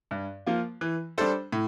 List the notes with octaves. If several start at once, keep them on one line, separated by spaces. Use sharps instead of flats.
G2
F3 A#3 F4
E3
G3 D4 A4 C5
A2